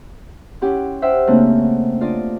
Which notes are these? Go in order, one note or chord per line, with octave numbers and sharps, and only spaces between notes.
C#4 E4 G4 F#5 C6
C5 E5 F#5 G5 F6
C#3 A3 A#3 C4 D4
D4 F4 D5 D#5